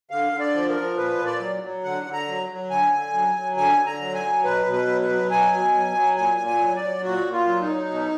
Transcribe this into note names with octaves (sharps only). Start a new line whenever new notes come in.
D3 F5
D3
D5
F3
A#4
F3
A#2 B4
A#2
D5
F#3
F#3
D3 F#5
D3
A#5
F#3
F#3
D3 G#5
D3
F#3
F#3
D3 G#5
D3
A#5
F#3
G#5
F#3
B2 B4
B2
B4
F#3
B4
F#3
B2 G#5
B2
F#3
F#3
A#2 G#5
A#2
G#5
F#3
D5
F#3
A#2 F#4
A#2
F4
F#3
D#4
F#3
B2